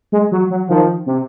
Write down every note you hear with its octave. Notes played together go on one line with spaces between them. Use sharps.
G#3
F#3
F#3
D#3 F3
C3